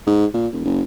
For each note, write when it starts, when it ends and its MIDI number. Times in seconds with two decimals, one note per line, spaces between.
0.07 0.26 44
0.34 0.47 46
0.53 0.62 28
0.65 0.82 30